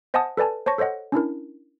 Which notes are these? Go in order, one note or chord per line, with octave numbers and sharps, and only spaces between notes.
C5 D#5 F#5 G#5 A5 D#6
A4 B4 D5 G#5 A5
C5 C#5 A5 C#6 A#6
A4 C5 C#5 D#5 F#5
C#4 D4 E4 A#4